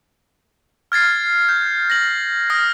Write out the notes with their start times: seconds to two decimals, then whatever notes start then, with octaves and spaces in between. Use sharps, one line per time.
0.92 F6 G#6 A6 C7
1.49 G6
1.90 A#6 F#7
2.50 D#6 F6 A#6